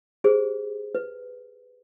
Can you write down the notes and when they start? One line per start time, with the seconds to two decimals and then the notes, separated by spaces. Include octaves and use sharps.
0.24 G4 G#4 C5
0.95 B4